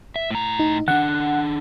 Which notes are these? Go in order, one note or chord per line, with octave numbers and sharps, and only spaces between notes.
E5
A2 A#5
D#4
D#3 D4 F#5